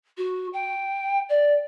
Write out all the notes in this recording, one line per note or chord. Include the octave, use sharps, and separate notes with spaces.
F#4
G5
D5